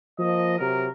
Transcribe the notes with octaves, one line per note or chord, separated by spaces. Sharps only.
F3 A#3 D#5
C3 F#3 A#4